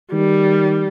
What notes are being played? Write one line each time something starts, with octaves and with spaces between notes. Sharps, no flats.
D#3 G3